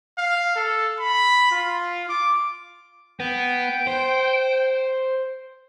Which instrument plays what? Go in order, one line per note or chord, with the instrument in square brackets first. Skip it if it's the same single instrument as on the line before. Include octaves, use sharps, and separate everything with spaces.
[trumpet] F5
A4
B5
F4
D6
[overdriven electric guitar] B3 [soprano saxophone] G5
[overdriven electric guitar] C5